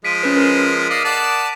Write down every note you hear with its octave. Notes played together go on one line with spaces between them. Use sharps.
F3 G#3 B6 D7 D#7
C#4 B4
A#4
D5 D#5 F5 D6 D#6
D5 F#5 A5